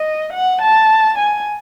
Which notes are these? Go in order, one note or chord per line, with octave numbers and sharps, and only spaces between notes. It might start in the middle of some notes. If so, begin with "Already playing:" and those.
Already playing: D#5
F#5
A5
G#5